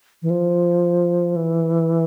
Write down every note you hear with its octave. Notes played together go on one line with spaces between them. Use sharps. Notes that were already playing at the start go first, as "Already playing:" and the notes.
E3
F3
E3